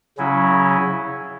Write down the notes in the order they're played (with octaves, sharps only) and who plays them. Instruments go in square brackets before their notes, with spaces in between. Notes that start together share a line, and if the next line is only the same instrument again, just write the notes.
[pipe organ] C#3 F#3 C#4 E4